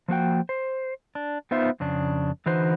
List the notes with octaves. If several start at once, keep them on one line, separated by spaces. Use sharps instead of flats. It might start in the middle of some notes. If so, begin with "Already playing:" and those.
F3 A#3 F#4 G5
C5
D4
B3 D#4 F4 C5 E5
F2 C#3 D4
D3 E3 D#4 F#4 B4 C5